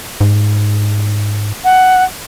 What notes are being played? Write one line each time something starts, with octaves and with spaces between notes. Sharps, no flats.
G#2
F#5